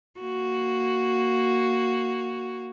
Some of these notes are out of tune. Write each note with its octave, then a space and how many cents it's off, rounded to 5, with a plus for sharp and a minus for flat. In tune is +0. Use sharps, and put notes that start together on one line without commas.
A#3 +0 F#4 +0